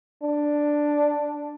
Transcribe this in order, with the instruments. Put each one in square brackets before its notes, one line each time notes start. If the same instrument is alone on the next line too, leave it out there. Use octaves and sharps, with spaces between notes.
[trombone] D4